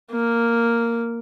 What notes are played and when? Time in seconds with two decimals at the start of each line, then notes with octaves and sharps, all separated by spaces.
0.11 A#3